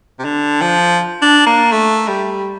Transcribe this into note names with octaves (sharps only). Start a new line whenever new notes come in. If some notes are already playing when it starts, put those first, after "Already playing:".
C3
D3
F3
D4
A#3
A3
G3